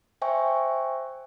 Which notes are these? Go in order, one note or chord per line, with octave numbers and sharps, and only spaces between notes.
C5 E5 G5 G#5 C#6